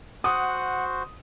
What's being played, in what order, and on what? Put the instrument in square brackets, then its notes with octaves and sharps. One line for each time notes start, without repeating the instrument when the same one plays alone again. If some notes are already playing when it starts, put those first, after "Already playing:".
[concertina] F#4 C5 [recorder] F#5 [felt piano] D#6